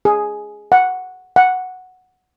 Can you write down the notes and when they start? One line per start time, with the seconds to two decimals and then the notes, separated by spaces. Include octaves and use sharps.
0.05 G#4
0.72 F#5
1.36 F#5